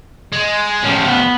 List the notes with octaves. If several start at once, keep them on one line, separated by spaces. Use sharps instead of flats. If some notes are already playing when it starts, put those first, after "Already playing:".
G#3
A2 F3 C#4 G4
B3